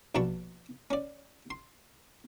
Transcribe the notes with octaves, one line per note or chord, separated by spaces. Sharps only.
A#1 B2 D4 A5 B5 C#6
C#4 D5
C6